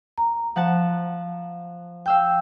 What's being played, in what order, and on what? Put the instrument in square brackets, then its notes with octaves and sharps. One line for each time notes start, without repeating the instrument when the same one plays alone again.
[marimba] A#5
[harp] F3 F#5 A5
[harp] F5 E6 G6 [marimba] G5